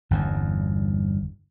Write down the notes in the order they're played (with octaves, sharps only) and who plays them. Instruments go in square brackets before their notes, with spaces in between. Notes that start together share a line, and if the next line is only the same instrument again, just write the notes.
[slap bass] G1 E2 G2